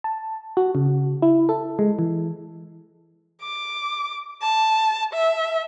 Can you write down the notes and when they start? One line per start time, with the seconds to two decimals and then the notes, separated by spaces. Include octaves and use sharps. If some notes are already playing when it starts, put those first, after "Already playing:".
0.04 A5
0.57 F#4
0.75 C#3
1.22 E4
1.49 A4
1.79 G#3
1.99 E3
3.41 D6
4.42 A5
5.13 E5